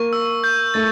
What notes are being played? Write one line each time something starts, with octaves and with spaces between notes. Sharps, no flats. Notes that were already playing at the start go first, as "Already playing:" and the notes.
Already playing: A#3 C#6
E6
G6
A3 A6